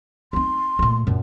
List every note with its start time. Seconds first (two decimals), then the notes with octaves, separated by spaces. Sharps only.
0.33 C4 D#4 C6
0.79 A#2 A3
1.07 F#2 A#2